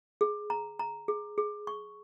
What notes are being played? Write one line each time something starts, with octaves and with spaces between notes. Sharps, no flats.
G#4
A#5
A#5
G#4
G#4
C#6